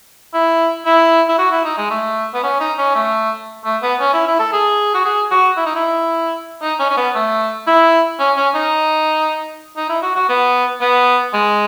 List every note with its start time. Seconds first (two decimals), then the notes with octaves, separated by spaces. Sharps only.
0.33 E4
0.86 E4
1.28 E4
1.38 F#4
1.51 E4
1.64 D#4
1.78 G#3
1.91 A3
2.34 B3
2.43 C#4
2.61 D#4
2.78 C#4
2.95 A3
3.65 A3
3.82 B3
4.00 C#4
4.13 E4
4.27 E4
4.39 A4
4.53 G#4
4.94 F#4
5.05 G#4
5.31 F#4
5.57 E4
5.66 D#4
5.75 E4
6.62 D#4
6.80 C#4
6.90 C#4
6.97 B3
7.15 A3
7.67 E4
8.19 C#4
8.37 C#4
8.55 D#4
9.77 D#4
9.89 E4
10.02 F#4
10.16 F#4
10.29 B3
10.81 B3
11.34 G#3